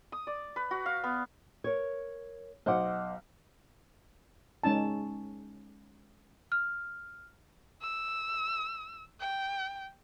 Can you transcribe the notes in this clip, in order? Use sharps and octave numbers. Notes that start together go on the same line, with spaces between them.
D#6
D5
B4
F#4
F5
B3
A#4 C#5
B1 C5 D#5 F#5 D6
G#3 C#4 D#4 A5
F6
E6
G5